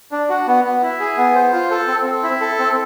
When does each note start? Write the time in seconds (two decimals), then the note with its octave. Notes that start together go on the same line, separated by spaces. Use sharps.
0.12 D4
0.30 F#4
0.47 B3
0.64 B3
0.83 E4
1.00 G#4
1.18 B3
1.35 C5
1.53 F4
1.71 A4
1.88 C4
2.06 C4
2.23 E4
2.41 A4
2.59 C4